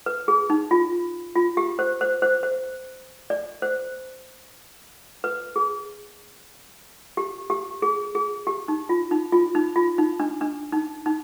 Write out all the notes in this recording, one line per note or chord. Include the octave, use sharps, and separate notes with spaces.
B4
G#4
D#4
F4
F4
G4
C5
C5
C5
C5
D5
C5
B4
G#4
G4
G4
G#4
G#4
G4
D#4
F4
D#4
F4
D#4
F4
D#4
D4
D4
D#4
D#4